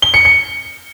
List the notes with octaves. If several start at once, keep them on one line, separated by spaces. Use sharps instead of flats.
G7
C#7
C#7